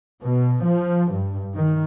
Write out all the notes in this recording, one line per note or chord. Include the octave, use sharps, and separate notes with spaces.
B2
F3
G2
D#3